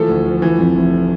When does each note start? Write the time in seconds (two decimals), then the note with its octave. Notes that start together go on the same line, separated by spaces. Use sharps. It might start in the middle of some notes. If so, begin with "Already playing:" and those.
Already playing: E3 F3 A3 A4
0.08 D2
0.25 F3
0.42 E3
0.58 F2
0.75 F1